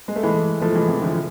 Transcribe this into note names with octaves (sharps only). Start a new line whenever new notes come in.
G#3
A3
E3 G#3
F3 A3
E3 G#3
C3 E3
D3 F3